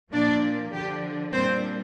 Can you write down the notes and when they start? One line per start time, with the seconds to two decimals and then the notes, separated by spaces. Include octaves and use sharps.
0.12 A#2 F3 A#3 D4 D5
0.72 D3 F3 D4 G4
1.33 A#2 G3 C4 D4 C5